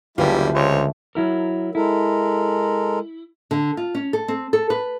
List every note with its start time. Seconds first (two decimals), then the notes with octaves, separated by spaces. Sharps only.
0.18 F#1 D2 G3 E4 F4 G4 B4
0.54 C#2 C5 C#5
1.15 F#3 E4 A#4
1.75 G#3 E4 A4 A#4
3.51 D3
3.77 F4
3.95 C#4
4.13 A4
4.28 C4
4.53 A4
4.70 B4